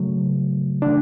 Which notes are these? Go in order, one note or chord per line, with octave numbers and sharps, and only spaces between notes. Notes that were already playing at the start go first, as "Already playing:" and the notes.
Already playing: C#3 F#3 A3
C#3 E3 A3 D4